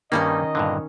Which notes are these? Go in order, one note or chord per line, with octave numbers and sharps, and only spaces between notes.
G2 D#3 G3 A#3 C#4 D#4 D#5
G2 A#2 D3